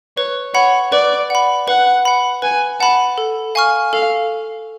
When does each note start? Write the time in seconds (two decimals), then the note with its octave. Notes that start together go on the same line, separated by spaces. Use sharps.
0.17 B4 C#5
0.55 C#5 F#5 B5
0.92 B4 D5
1.30 F#5 B5
1.68 B4 F#5
2.05 F#5 B5
2.42 B4 G#5
2.80 F#5 A5 B5
3.18 A4
3.55 F5 G#5 C#6 F6
3.93 A4 F5